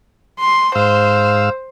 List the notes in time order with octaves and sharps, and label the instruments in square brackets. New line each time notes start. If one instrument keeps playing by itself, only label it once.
[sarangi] C6
[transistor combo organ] G#2 F5 E6 [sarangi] C5